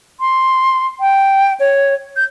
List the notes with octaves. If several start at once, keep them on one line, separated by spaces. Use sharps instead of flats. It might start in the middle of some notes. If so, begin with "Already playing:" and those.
C6
G5
C#5
G6